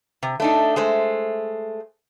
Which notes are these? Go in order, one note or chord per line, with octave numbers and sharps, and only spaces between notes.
C3
A3 D4 D#4
G#3 A3 C5